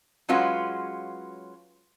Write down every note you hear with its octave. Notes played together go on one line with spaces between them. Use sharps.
F#3 G#3 C#4 F4 F#4 B4